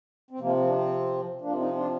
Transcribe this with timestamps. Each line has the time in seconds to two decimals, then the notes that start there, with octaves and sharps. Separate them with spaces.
0.31 C4
0.39 C3 F3 A#3
0.57 C4
0.67 D4
0.73 C4
1.41 C3 F3 A#3 D4
1.58 C4 D#4
1.75 D4 F4